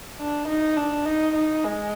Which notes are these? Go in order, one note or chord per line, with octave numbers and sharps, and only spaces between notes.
D4
D#4
D4
D#4
D#4
G#3